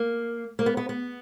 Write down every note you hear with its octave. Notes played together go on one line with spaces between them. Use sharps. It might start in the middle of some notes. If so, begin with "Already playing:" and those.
Already playing: A#3
A#3
B3
B3
B3